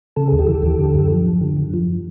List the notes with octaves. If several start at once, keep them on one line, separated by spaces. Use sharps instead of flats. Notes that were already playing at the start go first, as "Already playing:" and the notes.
C#3 A4
D#2 G#4
G4 A4
E3
D#2
D3
F#2
F3
F#2
D3
F#2
F3